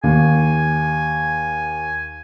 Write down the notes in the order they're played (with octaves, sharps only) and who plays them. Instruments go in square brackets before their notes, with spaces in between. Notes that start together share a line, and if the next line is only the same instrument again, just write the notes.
[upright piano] D#2 [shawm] G#5